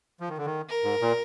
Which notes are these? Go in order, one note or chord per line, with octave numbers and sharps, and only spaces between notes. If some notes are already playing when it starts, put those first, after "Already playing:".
F3
D#3
D3
D#3
A#4
G#2
A#2